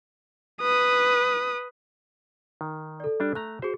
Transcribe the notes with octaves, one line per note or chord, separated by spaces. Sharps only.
B4 D#6
D#3
A4 D5
G3 D4
A3 A#5 F#6
F#4 G#4 C5